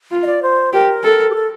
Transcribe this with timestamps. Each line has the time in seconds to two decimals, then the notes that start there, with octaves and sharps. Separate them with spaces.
0.11 F4
0.23 D#5
0.26 D5
0.42 C5
0.73 G4 A#4
1.04 A4
1.30 G4
1.34 A4